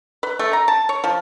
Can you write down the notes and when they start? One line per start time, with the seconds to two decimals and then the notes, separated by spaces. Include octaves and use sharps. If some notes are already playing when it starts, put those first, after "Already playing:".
0.23 B4
0.39 A3
0.53 A#5
0.68 A5
0.89 C#5
1.04 F3